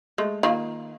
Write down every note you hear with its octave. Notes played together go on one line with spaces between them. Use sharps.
G#3 A3
D#3 A#3 F4